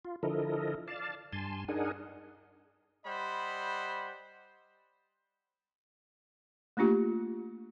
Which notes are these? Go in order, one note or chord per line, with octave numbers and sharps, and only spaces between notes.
F4
D3 F3 E4 A4 A#4 D#5
D5 F5 A5
G2 G#5 A5 C6
D4 D#4 G#4 A#4 F#5 G#5
G3 C5 D#5 F#5 B5
A3 A#3 D4 F4 G4